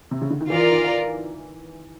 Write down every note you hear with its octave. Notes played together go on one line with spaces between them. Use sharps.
C3
C#3
D3
D#3
E3 F4 A#4 D5 F5
D#3